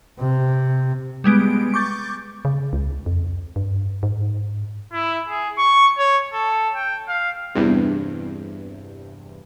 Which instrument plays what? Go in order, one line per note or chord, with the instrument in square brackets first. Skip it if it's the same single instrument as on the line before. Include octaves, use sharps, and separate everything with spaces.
[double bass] C3
[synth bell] G3 G#3 B3 D7
C#6 D6 G6 A6
[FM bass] C#3
C#2
F2
G2
G#2
[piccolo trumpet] E4
G#4
C#6
C#5
A4
G5
F5
[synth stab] E2 G2 C3